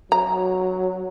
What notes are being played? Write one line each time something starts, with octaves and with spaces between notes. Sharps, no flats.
F#3 A#5